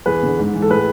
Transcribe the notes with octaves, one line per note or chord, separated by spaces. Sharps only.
E2 G#4 B4
D3
G#2
E3
A4
A2 G#4 B4